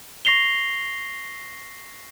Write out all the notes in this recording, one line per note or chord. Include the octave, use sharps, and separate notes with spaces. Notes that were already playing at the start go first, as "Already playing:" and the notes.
C#6 A#6 C7 F7 G7